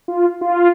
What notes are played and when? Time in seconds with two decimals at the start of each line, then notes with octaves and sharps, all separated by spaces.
0.08 F4
0.41 F4